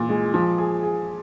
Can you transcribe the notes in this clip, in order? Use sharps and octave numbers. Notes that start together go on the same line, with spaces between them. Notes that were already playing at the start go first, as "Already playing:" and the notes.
Already playing: A#2 E3
G#3
F3
G#4
G#4